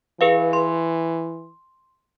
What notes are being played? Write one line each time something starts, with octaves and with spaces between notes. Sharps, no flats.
E3 G#4 B4 F5
C6